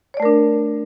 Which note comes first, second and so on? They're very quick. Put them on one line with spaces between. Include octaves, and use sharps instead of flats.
C#5 D5 A3 A#4 D4